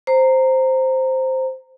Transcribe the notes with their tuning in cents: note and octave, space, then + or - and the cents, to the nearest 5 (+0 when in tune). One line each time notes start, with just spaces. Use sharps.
C5 +0 A#5 -10